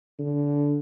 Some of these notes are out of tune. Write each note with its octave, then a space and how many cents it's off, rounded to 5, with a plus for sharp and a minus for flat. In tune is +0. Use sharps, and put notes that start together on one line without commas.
D3 -20